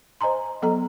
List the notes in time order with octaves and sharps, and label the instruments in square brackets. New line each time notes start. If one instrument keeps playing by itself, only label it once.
[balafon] C5 D#5 G#5 A#5 C6
F#3 B3 A4 D#5 A#5